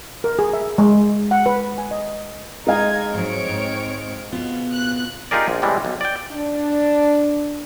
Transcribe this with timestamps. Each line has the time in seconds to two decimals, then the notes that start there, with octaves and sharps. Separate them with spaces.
0.24 A#4
0.39 G#4
0.53 E5
0.78 G#3
1.31 F#5
1.46 B4
1.78 G#5
1.91 D#5
2.67 G#3 D#4 D#5 F5 G#6
3.14 G#2 F#3 C4 C#5 D7
3.49 G#2
4.32 B2 B3 F4
4.73 F#6
5.31 D#4 F4 G4 G#4 A#4 D5
5.48 A#1
5.62 A2 C3 E3 G3 G#3
5.85 B1
6.01 D5 G5
6.32 D4